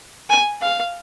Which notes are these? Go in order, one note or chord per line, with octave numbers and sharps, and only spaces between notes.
G#5
F5